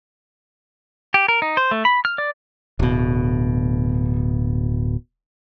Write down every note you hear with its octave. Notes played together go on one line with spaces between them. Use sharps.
G4
A#4
D#4
C5
A3
B5
F6
D5
D1 B2